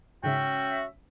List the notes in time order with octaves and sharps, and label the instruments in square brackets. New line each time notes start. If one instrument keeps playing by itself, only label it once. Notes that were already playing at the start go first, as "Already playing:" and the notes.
[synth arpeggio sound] G#2 C#3 [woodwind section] C#4 E5 [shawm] F#4 [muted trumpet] G5